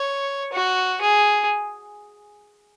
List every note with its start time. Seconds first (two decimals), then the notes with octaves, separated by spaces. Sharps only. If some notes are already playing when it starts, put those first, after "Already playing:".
Already playing: C#5
0.53 F#4
1.02 G#4